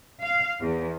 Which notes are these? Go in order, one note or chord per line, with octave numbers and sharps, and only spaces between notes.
F5
E2